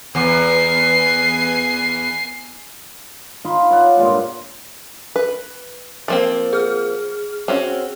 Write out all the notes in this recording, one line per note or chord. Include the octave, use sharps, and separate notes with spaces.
E2 G#5 C7
D#4 F4 B5 C6
C#5 D5 F#5
G2 A#2 G#3 F4
B4
F3 A#3 C4
G#4 F6
C4 C#4 F#4